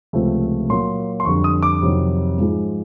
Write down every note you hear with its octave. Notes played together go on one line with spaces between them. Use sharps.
C#2 C3 F3 A3 C4
A#2 F#3 A#3 C6
C6
F2 D3 G3 C#6
D#6
D6
F2 C3 D#3 F#3
G#2 F3 G#3